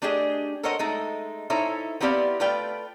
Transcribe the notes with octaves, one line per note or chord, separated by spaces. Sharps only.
A3 D4 G4 G#4 D#5
A4 A#4 C5 C#5 D#5 F#5
G#3 A3 D#4
D#4 E4 A4 C5 C#5 E5
B3 C4 E4 G4 D5 F5
A3 F4 B4 D5 F5 G5